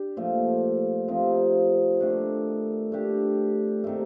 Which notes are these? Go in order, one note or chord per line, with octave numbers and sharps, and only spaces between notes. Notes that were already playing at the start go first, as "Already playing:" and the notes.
Already playing: D4 G4
A#2 F3 A3
C3 F3 C4 D#4
D#3 A3 D4
A3 D4 G4
C3 D#3 A3